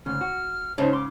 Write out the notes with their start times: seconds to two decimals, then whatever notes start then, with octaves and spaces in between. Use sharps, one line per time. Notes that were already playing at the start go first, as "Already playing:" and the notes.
0.06 D2 G#2 C#3 F6
0.21 F#4
0.78 G#2 C#3 D#4 C5 C#5 A5
0.93 C6 D6